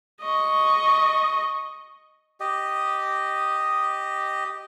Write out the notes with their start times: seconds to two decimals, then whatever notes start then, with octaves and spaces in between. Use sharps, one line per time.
0.22 D#5 C#6
2.40 G4 D#5